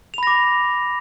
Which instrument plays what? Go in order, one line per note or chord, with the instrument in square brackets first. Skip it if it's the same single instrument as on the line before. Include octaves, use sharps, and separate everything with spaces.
[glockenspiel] F7
B5
A#6
D6